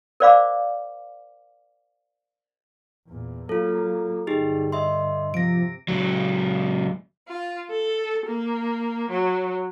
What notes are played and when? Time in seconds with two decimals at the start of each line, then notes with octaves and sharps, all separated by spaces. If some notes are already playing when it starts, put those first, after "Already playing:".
0.20 A#4 C5 D5 F5 B5 D6
3.07 E2 A#2
3.49 F#3 A#3 F4 A4
4.27 G2 D3 D#4 G4 G#4
4.72 D#5 E5 C6
5.34 C3 F3 A#6 D7
5.88 C#2 F#3
7.29 F4
7.71 A4
8.26 A#3
9.10 F#3